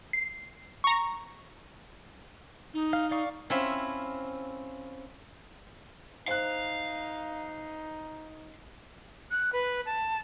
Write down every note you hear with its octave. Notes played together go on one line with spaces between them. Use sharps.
C7
A#5 C#6
D#4
F5
D5 F5 C#6
C4 C#4 E4 F4 E5
D#4 C5 F5 F#6
F#6
B4
A5